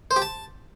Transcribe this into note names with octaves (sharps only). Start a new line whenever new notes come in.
C5
G4
A5